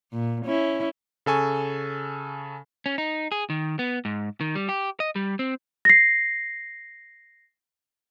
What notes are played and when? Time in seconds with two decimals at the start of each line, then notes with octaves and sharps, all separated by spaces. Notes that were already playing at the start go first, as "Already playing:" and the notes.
0.12 A#2
0.45 C#4 E4
1.26 C#3 A4 G#5 C#6
2.86 C#4
2.98 D#4
3.32 G#4
3.50 D#3
3.79 B3
4.05 G#2
4.41 D#3
4.55 G3
4.69 G4
5.00 D#5
5.16 G3
5.39 C4
5.85 A#6 C7